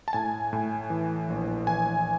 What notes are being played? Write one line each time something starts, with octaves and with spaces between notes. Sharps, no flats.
A5
A2 G#5
A2
E3
A#1
E3 G#5